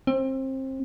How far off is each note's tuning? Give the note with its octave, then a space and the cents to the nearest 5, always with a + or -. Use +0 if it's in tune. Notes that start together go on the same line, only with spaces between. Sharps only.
C4 +25